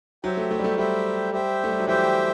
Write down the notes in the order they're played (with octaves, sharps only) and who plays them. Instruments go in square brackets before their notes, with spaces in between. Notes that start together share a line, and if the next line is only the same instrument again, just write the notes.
[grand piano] F#3 [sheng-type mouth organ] G4 C5 E5 G5
[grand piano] A3
A3
G3
A3
[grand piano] G3 [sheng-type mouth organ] G4 C5 E5 G5
[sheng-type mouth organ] G4 C5 E5 G5
[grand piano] A3
G3
F#3
[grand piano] E3 [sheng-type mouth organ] G4 C5 E5 G5